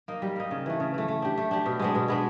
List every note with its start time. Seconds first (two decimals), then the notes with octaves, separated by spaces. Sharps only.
0.08 A#3 D#4
0.22 G3
0.36 A#3 D#4
0.51 C#3
0.66 E3 A3
0.80 C#3
0.94 E3 A3
1.08 A3
1.22 D4 G4
1.38 A3
1.51 D4 G4
1.66 B2
1.79 G#3 B3 D4
1.95 B2
2.08 G#3 B3 D4